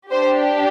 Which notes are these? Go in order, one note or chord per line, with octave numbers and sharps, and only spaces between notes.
D4 G4 C5